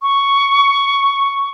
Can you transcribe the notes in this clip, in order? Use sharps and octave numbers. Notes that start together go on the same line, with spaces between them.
C#6